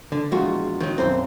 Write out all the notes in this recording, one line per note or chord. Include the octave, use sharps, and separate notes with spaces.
D3
A#1 E2 G#3 F4 F#4
D#3 F#3
B1 F#2 C4 C5